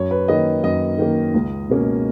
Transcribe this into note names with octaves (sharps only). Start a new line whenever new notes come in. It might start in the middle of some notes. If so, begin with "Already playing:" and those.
Already playing: F#2 C#5
B4
D#3 A#3 D#5
F#2 D#5
D#3 A#3
C#2
B2 A#3 C#4